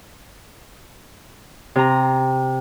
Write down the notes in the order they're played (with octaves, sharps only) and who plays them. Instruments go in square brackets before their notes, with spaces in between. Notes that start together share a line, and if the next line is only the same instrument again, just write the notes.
[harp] C3 A#5